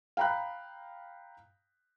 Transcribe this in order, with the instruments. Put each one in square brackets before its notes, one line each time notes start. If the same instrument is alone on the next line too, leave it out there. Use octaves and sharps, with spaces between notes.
[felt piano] F5 G5 A#5 B5 F#6